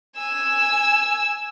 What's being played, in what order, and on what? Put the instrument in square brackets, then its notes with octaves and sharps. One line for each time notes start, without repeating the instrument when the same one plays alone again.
[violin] G#5 E6